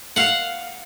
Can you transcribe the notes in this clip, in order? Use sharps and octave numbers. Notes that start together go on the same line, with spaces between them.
F5 F#5